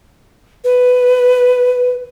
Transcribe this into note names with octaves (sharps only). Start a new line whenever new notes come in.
B4